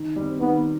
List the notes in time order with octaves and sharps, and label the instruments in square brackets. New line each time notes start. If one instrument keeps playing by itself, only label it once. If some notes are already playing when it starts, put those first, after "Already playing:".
Already playing: [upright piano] D#3
G3 C4
[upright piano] D#3 [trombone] B3